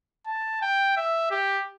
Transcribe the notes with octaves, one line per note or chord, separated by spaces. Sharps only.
A5
G5
E5
G4